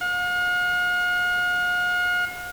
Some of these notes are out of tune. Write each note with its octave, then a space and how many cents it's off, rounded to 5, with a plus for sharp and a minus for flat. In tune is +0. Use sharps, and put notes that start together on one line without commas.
F5 +45